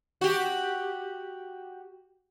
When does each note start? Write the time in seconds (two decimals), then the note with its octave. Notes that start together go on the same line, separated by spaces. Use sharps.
0.21 F#4 G4